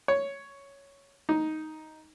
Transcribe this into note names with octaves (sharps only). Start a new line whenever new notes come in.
C#5
D#4